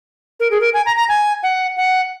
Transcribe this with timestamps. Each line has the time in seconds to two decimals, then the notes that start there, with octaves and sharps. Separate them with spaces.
0.40 A#4
0.51 G#4
0.61 A#4
0.74 G#5
0.86 A#5
0.97 A#5
1.09 G#5
1.43 F#5
1.77 F#5